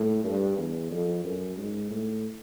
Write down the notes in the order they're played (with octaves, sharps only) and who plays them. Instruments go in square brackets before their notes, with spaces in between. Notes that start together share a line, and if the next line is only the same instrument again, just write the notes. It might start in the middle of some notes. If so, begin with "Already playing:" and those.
Already playing: [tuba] A2
G2
E2
F2
F#2
G#2
A2